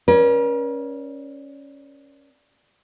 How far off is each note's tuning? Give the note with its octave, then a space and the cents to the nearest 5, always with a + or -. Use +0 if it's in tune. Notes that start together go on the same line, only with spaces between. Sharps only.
C#4 +0 A#4 +45 D5 +0